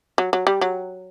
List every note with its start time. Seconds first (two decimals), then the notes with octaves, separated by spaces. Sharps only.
0.18 F#3
0.33 F#3
0.47 G3
0.61 F#3